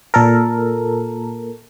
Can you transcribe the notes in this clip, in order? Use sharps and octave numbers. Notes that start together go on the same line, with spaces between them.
A#2 A4 A#4